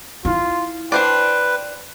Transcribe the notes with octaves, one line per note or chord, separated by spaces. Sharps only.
E4 F4
D4 B4 C5 D5 G5